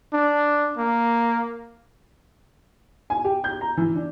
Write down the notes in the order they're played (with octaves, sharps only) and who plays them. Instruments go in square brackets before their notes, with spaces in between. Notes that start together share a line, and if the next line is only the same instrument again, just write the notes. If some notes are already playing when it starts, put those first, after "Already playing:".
[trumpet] D4
A#3
[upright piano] G#5
G4
G6
A#5
E3
D4